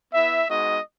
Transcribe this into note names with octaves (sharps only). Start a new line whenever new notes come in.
B3 E4 E5
G#3 B3 D#4 F#4 D#5